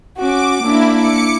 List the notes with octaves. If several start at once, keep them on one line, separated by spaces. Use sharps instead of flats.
C#4 F#4 D6
A#3 D4 E4
D6 C#7